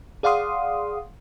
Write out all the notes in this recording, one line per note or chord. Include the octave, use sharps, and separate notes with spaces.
G#4 D5 F5 F#5 C6 D#6